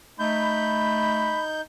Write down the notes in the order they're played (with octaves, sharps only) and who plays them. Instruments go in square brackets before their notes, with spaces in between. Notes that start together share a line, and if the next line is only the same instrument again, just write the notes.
[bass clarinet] A3 [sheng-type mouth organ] D#4 G6 [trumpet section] B5